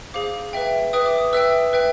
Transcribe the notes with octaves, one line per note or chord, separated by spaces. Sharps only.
G#4 C5 F5 D6
B4 E5 G5
B4 E5 G5 D#6
D6
D#6
B4 E5 G5 E6
B4 E5 G5